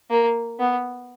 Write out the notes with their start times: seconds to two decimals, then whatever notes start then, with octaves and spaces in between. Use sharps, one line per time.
0.10 A#3
0.59 B3